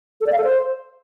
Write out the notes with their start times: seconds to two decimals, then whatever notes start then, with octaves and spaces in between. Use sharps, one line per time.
0.21 A4
0.26 D5
0.32 F5
0.38 A4
0.44 C5